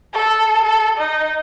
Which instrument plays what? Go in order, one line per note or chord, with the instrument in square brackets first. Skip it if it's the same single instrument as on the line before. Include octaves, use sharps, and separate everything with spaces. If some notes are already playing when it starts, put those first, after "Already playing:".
[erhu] A4
A4
D#4